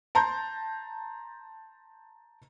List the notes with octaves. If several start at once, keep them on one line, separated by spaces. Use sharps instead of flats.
A5 A#5 C6 G6